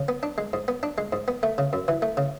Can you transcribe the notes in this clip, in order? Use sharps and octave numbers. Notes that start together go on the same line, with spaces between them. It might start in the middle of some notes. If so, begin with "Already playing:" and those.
Already playing: C#3
B3
D4
G#3
G#2
B3
D4
G#3
G#2
B3
A3
C#3
F#2
E3
A3
C#3